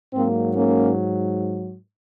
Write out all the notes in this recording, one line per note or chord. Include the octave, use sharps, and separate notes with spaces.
G#2 F#3 A#3 C4
A#3 C#4